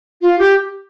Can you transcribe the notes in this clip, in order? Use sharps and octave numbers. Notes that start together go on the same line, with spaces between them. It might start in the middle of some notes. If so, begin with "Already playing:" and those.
F4
G4